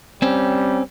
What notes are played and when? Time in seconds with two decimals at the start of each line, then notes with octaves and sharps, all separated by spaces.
0.22 G3 C4 C#4